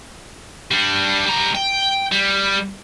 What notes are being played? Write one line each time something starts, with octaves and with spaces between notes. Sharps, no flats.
G3 D4
G3 A#5
G5
G3